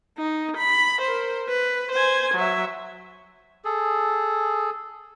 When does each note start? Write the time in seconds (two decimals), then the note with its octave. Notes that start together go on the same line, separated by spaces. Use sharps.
0.18 D#4
0.57 B5
1.02 A#4 C5
1.49 B4
1.92 C5 G#5
2.35 F#3 E5
3.65 G#4 A4